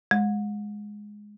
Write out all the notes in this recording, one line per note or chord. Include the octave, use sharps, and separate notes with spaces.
G#3